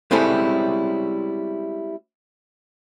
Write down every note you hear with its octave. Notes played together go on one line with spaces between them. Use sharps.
G3 G#3 C4 C#4 E4 A4